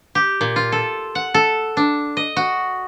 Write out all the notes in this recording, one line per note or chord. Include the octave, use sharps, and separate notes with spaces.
G4
A#2
F4
A4
F#5
A4
D4
D#5
F#4